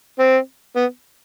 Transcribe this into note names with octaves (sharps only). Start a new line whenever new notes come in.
C4
B3